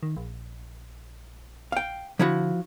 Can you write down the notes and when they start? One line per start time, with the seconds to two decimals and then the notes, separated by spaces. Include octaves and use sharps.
0.03 D#3
0.17 A#1
1.72 F5 G5
2.19 D3 F3 E4 F#4